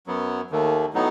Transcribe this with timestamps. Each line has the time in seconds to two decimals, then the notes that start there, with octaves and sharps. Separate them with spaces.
0.07 F#2 F#3 B3
0.50 D#2 D#3 A3
0.93 A2 F#3 B3 D#4